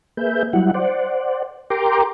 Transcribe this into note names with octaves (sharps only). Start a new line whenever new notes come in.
A#3 G#4 B4 E5 G6
F#3 G3 E4 F#5
C5 D5 F#5
G4 A#4 G5 A#5 C6 D6